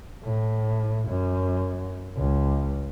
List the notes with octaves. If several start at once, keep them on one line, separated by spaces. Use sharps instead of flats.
A2
F#2
C#2